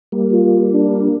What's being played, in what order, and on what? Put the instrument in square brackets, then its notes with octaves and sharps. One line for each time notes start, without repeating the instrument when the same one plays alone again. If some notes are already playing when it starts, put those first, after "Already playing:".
[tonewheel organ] G3 A#3
[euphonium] F4
D4